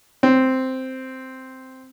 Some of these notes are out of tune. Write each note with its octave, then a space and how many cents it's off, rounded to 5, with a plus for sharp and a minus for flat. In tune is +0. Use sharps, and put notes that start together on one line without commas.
C4 -5